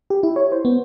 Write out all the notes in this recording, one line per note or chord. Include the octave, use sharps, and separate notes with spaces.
G4
E4
C#5
C5
B3